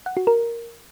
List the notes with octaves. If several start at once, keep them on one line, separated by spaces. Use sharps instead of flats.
F#5
F#4
A#4